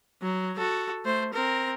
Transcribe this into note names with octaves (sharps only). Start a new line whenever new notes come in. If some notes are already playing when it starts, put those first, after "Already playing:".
F#3
F#4 A4
A3 C5
C4 A#4